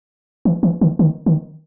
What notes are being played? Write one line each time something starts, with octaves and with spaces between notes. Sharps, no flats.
E3
E3
D#3
D#3
D#3